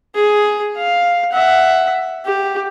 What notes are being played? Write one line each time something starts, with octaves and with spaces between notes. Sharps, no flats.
G#4
F5
E5 F#5
G4